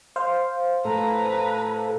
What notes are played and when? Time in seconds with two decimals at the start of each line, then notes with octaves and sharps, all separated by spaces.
0.16 C5 F5
0.85 A2 A4 B4 A#5